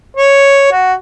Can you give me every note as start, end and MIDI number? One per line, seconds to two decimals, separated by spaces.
0.16 0.71 73
0.72 0.93 66